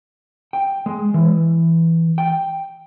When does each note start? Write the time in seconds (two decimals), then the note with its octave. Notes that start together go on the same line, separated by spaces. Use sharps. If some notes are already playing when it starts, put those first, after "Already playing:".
0.53 G5
0.86 G#3
1.14 E3
2.18 G5